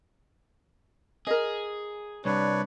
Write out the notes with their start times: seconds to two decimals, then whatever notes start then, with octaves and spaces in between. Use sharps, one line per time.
1.27 G#4 A#4 D#5
2.25 C2 D4 B4 C#5